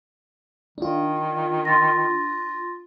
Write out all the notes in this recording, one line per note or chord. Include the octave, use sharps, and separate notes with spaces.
D#3 D4 F4
C6 A6 A#6